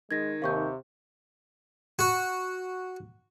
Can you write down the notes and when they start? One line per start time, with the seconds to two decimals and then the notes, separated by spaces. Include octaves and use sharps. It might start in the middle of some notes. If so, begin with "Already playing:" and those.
0.11 D#3 G#3 G#6 A#6
0.42 D#2 C3 F5 C#6 G6
1.99 F#4